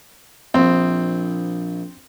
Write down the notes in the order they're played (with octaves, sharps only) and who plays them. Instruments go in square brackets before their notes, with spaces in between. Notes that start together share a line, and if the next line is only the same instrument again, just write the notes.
[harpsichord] A#1 [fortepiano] C4